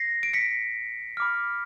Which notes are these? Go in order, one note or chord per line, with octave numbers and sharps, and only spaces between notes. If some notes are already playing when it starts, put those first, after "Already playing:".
Already playing: A#6 C7
D7
B6 C#7
B5 D6 F6